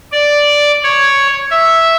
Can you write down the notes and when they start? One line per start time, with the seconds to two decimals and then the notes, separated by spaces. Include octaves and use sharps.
0.12 D5
0.84 C#5
1.51 E5